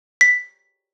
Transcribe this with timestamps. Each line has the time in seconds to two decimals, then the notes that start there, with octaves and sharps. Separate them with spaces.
0.21 B6